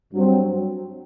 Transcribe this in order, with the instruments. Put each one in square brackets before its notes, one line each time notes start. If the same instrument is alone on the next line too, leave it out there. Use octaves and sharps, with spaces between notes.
[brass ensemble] G2 F#3 C4